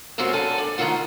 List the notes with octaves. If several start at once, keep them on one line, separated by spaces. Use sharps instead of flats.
F#2 G#3 A3 C4 F4 F#4
F#2 A#2 A#3 D4 A4 G#5
D5
G#2 D#3 F#3 A3 F4 F#5